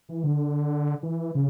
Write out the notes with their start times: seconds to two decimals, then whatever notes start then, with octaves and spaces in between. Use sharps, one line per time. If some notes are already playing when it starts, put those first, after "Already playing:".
0.09 E3
0.24 D3
1.03 E3
1.35 C#3